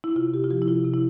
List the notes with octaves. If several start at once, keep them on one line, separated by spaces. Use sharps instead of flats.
E4
C3 F4
C3 G4
F4
F3 G4
E4
C3 F4
C3
E4